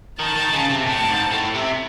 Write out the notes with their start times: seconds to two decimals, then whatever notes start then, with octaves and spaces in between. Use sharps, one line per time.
0.19 D#3 A5
0.36 D#3
0.53 C#3
0.70 C3
0.87 A2 A5
1.09 G#2
1.32 A2
1.55 C3